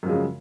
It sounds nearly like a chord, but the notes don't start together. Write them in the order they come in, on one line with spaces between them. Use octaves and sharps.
F#2 F3 G#3 C#3